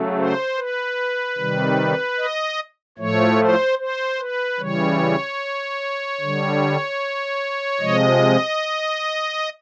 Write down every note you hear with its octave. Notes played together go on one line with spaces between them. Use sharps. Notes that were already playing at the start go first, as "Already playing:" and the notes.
Already playing: C#3 F#3 A3
C5
B4
C3 D#3 G3
D#5
A2 F3 A3 C#5
C5
C5
B4
C#3 E3 G3 C#5
D3 G3
C3 F3 G#3 D#5